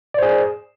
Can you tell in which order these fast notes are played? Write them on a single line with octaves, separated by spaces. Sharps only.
D5 C5 G#4